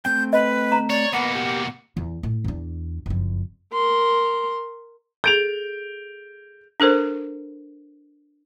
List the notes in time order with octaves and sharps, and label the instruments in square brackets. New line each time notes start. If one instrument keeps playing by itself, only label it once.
[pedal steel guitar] A3 C4 G5 [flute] G6
[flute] B4 [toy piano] D#5
[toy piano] A#5
[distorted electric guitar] C#5 [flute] D5
[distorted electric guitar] B2 A#3 [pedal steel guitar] B4 [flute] F#5
[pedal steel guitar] G4 A#4
[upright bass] E2
A2
E2 D4
F#1 F2
[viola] A#4 C6
[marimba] G#4 A4 [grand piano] G6 D7 F7
[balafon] D4 A4 A#4 C5